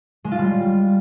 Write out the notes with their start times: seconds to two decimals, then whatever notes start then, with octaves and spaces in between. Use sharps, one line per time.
0.24 G#3
0.32 F4
0.39 G3